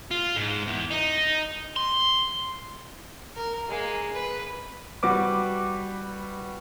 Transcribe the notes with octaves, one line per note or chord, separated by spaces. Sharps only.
F4
G#2
E2
D#4
C6
A#4
G#3 A#3
B4
G3 F#4 B4 D6